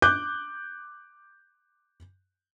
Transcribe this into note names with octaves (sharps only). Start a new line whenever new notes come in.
D6 F#6 G6